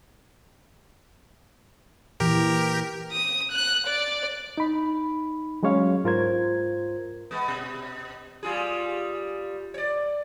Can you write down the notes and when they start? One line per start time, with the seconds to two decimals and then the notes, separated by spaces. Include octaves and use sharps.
2.20 A#2 E3 G4 A#4
3.12 D#6
3.52 F#6
3.87 D5
4.58 D#4 B5
5.63 F#3 G#3 C#4 C#5 F5
6.04 G#2 F4 A#4 C5 G#6
7.31 G#3 B3
7.48 B2
8.43 G3 F4 G#4
9.74 C#5 D5